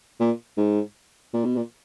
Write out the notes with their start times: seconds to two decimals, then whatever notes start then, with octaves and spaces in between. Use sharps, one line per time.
0.20 A#2
0.58 G#2
1.34 A#2
1.45 B2
1.57 A#2